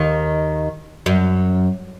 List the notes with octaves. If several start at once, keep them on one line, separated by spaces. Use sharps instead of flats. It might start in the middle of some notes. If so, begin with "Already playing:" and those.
Already playing: D#2 D#3
F#2